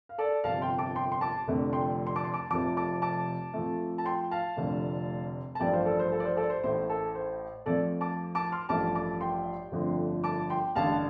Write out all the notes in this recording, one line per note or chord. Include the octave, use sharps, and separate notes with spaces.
F5
A4 D5
G1 F2 C3 F5 A5
G5 C6
A5 D6
G5 C6
C6
A5 D6
F1 F2 D3 A3
G5 C6
C6
A5 D6
C6
A5 D6
F1 F2 C3 F3 A5 D6
A5 D6
A5 D6
F2 F3 A3
A5
G5 C6
F5 A5
F1 F2 D3 A3
A5
A1 G2 F3 A3 D5 G5
C5 F5
A4 D5
C5
A4
D5
C5
A4 D5
C5
A1 A2 A3 C5
A4
C5
F2 F3 A3 A4 D5
A5 D6
A5 D6
C6 F6
A1 G2 F3 A3 A5 D6
A5 D6
G5 C6
G1 F2 D3 F3 A3
A5 D6
G5 C6
A1 G2 D3 F5 A5